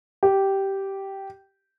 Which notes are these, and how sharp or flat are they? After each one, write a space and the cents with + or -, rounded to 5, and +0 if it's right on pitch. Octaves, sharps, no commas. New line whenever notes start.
G4 -10